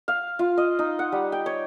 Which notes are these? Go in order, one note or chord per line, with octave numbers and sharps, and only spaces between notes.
F5
F4
D#5
D#4
F#5
G3
G5
C#5